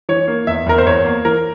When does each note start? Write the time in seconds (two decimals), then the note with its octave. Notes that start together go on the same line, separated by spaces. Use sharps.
0.09 E3 C#5
0.28 A#3
0.47 E2 E5
0.66 E2 A#4
0.78 C5
0.86 E2 C#5
1.05 A#3
1.25 E3 A#4